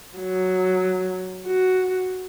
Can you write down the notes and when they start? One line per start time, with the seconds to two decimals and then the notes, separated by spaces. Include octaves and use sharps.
0.19 F#3
1.47 F#4